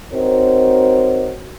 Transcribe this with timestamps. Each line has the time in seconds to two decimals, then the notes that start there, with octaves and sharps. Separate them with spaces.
0.13 C4 D#4 F#4 A#4 C5 C#5